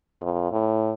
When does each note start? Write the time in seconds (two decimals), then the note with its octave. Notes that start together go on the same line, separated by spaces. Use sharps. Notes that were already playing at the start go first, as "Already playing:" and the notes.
0.22 F2
0.52 A2